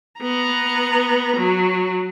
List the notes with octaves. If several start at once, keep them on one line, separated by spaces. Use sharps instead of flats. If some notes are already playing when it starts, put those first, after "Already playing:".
B3 A#5
F#3